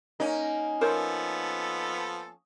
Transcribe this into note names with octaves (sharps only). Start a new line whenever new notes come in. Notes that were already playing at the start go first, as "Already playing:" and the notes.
A#3 C#4 D#4
F3 B3 A4 A#4 C5 C#5